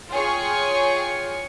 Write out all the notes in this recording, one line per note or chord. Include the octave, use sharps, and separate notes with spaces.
F4 G#4 C#5 G5 C#6